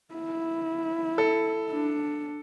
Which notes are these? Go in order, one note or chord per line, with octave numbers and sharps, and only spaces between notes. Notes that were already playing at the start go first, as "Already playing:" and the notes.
E4
A4
D4